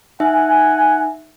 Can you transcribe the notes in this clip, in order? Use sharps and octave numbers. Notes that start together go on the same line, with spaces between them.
D#4 E5 F#5 G#5